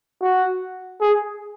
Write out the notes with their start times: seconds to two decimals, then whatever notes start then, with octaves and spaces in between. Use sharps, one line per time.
0.22 F#4
1.01 G#4